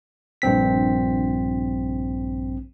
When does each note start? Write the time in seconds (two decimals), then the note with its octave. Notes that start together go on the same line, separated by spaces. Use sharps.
0.42 A#1 G2 C4 B6